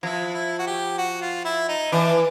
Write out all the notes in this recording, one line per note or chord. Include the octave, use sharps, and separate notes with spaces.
F3 E4
E4
F#4
G4
F#4
F4
E4
D#4
E3 D4